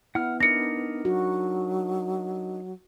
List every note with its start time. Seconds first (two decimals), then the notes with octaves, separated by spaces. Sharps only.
0.15 B3 E4 F#5 F6
0.40 D4 D#4 A#4 A#6 C#7
1.05 F#3 F#4